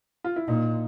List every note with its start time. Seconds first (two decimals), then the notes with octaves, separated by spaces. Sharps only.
0.24 F4
0.36 E4
0.48 A#2 D#4